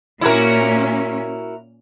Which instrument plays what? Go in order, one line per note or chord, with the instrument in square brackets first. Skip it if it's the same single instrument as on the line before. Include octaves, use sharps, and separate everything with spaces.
[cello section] A#2 A#3 C#4 [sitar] E4 F#4 A#4